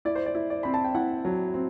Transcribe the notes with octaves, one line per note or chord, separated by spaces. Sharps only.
E4 D5
C5
D5
E4
D5
C4 B5
A5
G5
E4 F#5
F#3
C4